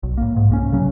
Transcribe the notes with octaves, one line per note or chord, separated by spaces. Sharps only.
B1
A2 A#3
G#2
C2 A#3 C#4
C#3 F#3 C#4